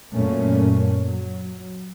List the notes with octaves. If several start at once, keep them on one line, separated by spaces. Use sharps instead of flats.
F#2 A#2 A3 A#3 C#4
F#3